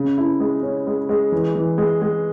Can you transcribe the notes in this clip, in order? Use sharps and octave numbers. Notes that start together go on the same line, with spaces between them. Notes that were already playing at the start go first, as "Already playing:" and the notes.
Already playing: C#3
E4
G#3
C#4
G#3
G#3
E3
E3
G#3
G#3